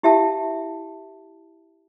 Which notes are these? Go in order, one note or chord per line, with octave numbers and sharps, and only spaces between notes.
E4 G4 E5 F5 A5